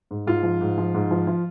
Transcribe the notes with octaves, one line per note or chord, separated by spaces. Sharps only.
G#2
G#2 F4
F3
G#2
F3
G#2
F3
F3